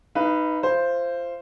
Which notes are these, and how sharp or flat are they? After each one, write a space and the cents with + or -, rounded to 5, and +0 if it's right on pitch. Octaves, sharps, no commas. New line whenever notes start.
D#4 +0 B4 +0 F5 -45
F4 -30 C5 +0